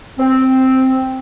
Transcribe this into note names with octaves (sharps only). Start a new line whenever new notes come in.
C4